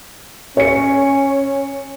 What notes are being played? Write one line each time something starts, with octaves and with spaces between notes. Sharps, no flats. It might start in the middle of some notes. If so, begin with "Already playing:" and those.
C#4 C#5 C#7